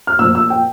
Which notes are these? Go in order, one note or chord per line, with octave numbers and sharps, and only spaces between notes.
F6
A#2 F3 E6
E6
G5